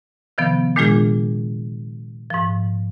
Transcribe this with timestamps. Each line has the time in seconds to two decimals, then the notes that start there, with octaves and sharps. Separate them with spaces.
0.38 C3 D#3 F3 B3
0.76 A#2 D#3 G#3 D4 F4 G#4
2.30 G#2 F3